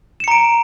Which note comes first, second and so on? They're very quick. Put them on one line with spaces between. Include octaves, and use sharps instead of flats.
E7 C#7 A#5 D7